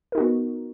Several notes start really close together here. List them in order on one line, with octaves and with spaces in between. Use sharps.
A#4 D#4 F#4 B3